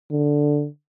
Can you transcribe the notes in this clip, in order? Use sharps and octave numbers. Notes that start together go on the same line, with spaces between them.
D3